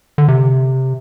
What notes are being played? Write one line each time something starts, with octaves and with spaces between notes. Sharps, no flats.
D3
C3